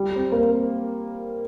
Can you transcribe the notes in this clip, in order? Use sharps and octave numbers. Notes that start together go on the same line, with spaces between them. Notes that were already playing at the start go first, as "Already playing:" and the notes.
Already playing: G3
C4
A#3
C4